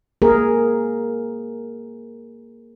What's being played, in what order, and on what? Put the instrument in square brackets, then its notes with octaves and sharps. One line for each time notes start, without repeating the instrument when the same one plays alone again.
[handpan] A#3 G#4 A#4